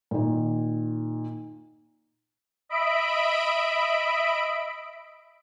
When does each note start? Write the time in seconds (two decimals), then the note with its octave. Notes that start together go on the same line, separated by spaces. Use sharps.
0.11 A#2 D#3
2.69 D#5 E5 B5 D7